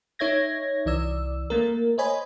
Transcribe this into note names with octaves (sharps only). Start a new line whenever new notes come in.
D#4 C#5 E5 G#6 A#6
C2 E3 D5 E6
A3 A#3 A#4
C5 C#5 D#5 G#5 B5